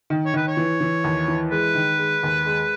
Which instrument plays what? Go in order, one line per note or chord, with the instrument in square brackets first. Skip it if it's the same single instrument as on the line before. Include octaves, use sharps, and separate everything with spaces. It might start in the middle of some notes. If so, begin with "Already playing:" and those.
[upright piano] D#3
[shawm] C#5
[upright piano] D#3 [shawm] B4
[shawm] C#5
[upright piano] E3
E3
D#2
E3
[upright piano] G#3 [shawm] B4
[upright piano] D#3
G#3
D#2
G#3